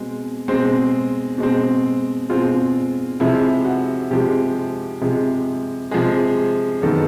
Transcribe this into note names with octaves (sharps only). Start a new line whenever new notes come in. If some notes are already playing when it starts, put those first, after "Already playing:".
Already playing: B2 G#3 C4
B2 G#3 C4
B2 G#3 C4
B2 G#3 C4 F4
C3 F3 G#3 E4
F#4
C3 F3 G#3 G4
C3 F3 G#3
C3 F3 G#3 G#4
F#2 D#3 G#3 B3 A4